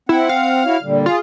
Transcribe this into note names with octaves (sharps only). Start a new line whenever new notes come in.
C4 E4 F#5
F5
E4 F#4 C#5
A#2 D3 G3
F4 G#4